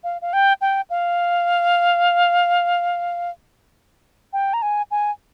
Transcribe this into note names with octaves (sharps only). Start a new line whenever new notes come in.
F5
F5
G5
G5
F5
G5
A#5
G#5
G#5